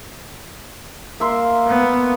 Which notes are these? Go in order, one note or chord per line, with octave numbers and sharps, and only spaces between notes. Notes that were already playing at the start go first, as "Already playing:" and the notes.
A#3 E5 C6
B3